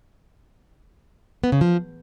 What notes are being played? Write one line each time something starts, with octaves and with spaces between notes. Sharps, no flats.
B3
C#3
F3